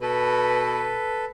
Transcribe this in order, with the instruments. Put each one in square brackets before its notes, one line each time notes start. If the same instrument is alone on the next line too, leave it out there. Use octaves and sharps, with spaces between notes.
[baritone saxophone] B2 [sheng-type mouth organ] A4 B4